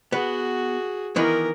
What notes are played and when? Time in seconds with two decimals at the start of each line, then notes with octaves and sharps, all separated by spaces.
0.12 B3 F#4 G#4
1.16 D#3 E3 B3 A#4